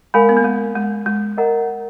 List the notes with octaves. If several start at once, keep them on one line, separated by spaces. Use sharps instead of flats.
G#3 A#4 F5 G#5 B5
B3
A#3
G#3
G#3
G#3
A#4 D#5 F#5 A#5